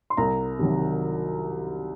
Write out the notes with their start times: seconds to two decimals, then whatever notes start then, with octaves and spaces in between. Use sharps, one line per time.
0.10 C6
0.17 C2 A#5
0.59 C3 D#3 F#3